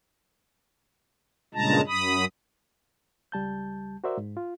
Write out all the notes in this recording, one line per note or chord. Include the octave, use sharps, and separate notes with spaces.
G2 A#2 C#3 G#3 A5 A#5
F#2 B5 D#6
C#2 G3 A5 G6
F#4 A#4 C5 D5 E5
G#2
F4